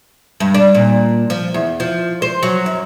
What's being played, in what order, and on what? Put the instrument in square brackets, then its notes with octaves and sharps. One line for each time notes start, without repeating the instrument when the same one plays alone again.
[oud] G2
D4
A#2
F3
E2
F3
C5
F#3
F#2